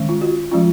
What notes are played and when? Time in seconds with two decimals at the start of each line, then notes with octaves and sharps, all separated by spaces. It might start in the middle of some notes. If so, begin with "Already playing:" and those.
Already playing: D#3 G#3 C#4
0.09 F4
0.21 F#4
0.51 F3 G#3 C#4 F4